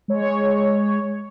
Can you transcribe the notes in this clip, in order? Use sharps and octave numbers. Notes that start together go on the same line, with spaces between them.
G#3 C#5